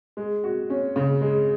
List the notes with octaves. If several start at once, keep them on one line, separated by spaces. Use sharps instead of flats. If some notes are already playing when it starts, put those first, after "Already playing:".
G#3
F#4
C#4
C#3
G#3